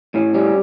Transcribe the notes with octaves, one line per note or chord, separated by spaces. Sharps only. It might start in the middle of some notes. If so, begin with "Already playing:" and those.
A2 C#4
G3 C#4